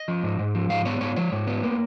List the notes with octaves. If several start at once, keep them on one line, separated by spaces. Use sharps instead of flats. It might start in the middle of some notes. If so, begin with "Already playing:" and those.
Already playing: D#5
F3
G#2
G#2
F3
G#2 F5
B3 C#5
G#2 C#5
F3 C#5
G#2
B3
A#3